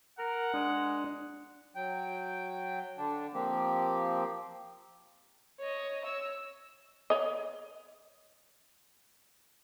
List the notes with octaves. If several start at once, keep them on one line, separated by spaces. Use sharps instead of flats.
A#4 F#5
G#3 D4
F#3 G5
D3 D4
F3 A#3 C4 G4
C#5 D#5
C#5 E6
C#5 D#5